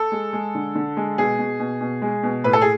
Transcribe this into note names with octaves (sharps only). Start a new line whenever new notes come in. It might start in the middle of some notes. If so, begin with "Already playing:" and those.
Already playing: A4
G#3
G#3
D3
D3
G#3
B2 G#4
B2
B2
B2
G#3
B2
A2 B4
A4
G#4